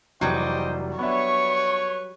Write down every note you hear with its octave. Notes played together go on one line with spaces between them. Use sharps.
F1 E3 F#3 G3 C5 D#5 G5
B3 D4 B4 C#5 E5 C#6